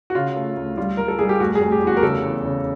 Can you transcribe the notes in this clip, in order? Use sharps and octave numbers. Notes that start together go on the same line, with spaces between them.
F#4
C#3 F4
A3
D2
G3 F4
G3 A#4
A4
G3 G#4
G4
F1 F#4
G#4
F1
G4
E2
F#4
A#4
C#3 A4
E2
C#3